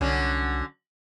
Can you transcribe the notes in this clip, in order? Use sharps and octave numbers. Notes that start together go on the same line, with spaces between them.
C2 D3 F#3 C#4